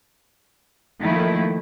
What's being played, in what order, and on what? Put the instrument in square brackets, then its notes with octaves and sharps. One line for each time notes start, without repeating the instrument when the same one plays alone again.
[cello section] D#3 F3 A3 A#3 E4